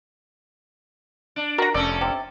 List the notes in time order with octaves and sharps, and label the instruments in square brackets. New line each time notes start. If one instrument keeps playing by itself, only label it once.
[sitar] D4
[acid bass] F#4 [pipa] A#4 A#5
[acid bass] F1 [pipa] A3 [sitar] C#4 A4 D5
[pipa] C3